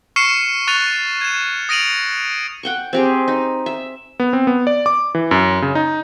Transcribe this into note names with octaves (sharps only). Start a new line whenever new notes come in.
C#6 F6 C7 C#7 D#7 E7
C#6 F#6 A6 D#7 F7
G#6 E7
D#6 A#6 D7 D#7 F7 F#7
F#5 G5 C#6
C4 G4 G#4
D#4
E5
B3
C4
B3
D5
D6
E3
F#2
C#3
D#4